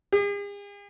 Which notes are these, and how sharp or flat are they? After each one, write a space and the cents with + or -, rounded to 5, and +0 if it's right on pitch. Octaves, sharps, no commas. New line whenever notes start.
G#4 -45